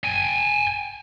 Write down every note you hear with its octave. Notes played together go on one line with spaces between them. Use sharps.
G5 G#5